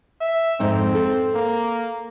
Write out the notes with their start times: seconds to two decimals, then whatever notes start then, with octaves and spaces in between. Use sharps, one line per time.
0.20 E5
0.60 F2 G#2 C4 D#4
0.95 A4
1.35 A#3